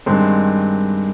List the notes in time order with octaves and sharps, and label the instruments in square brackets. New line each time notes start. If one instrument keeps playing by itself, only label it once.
[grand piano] G2 D#3 G#3 C4